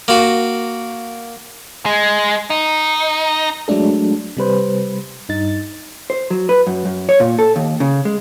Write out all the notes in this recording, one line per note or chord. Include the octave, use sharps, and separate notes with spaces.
A#3 F#4
G#3
D#4
F#3 G#3 A3 D4 A4
C3 G3 B4 C5
G2 D#4 A6
C5
F#3
B4
F#2
F#2
C#5
A#2
A4
D#2
C#3
G#3